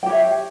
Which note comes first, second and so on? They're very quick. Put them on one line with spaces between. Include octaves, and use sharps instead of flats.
G5 G4 C#5 E5